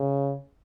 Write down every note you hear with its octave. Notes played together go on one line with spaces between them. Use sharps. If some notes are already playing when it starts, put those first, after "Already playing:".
Already playing: C#3